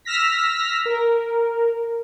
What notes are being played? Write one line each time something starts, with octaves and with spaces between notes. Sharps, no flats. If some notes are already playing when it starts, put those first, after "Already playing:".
E6 F6 A#6 B6
A#4